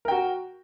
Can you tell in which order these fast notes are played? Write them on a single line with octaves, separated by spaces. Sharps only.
A#4 G5 F#4